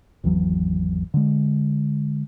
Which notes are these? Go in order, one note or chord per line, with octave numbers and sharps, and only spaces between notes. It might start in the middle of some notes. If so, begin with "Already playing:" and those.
G#1 E2 E3 F#3
D3 G#3